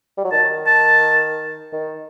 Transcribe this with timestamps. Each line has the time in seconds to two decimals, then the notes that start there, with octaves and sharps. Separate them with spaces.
0.18 G3
0.24 F#3
0.32 D#3 A5
0.66 A5
1.73 D#3